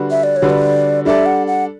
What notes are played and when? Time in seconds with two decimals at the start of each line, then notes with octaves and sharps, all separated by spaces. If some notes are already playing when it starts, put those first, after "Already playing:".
Already playing: D3 G3 D4 F#4 B4
0.11 E5
0.24 D5
0.36 C#5
0.42 D3 G3 D4 F#4 B4
0.50 D5
1.05 G3 D4 A4 D5 E5
1.26 F#5
1.47 F#5